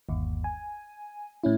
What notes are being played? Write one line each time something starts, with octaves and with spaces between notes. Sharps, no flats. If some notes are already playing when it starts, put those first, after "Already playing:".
G1 D#2
G#5
A2 C#4 E4